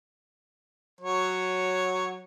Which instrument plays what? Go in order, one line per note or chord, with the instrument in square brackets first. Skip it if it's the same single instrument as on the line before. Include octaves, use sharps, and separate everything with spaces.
[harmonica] F#3 C#5